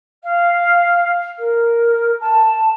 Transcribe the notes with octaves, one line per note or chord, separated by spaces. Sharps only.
F5
A#4
A5